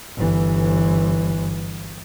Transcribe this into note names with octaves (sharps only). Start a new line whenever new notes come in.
G1 E3